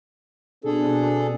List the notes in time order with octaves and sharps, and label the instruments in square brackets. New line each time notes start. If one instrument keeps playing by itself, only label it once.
[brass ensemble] B2 C4 D4 [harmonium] G#4 A4